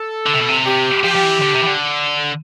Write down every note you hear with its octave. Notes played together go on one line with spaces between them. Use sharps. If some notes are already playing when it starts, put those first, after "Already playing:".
Already playing: A4
D3
C3
B2
C3
G4
F3 G4
F3
E3
D3
C3
E3
D3